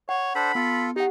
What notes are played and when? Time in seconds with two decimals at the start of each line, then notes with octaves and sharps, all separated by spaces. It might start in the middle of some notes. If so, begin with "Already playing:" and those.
0.09 C#5 F#5
0.35 D4 A4 C5 B5
0.55 B3 F4 A4
0.96 D#4 G4 F#5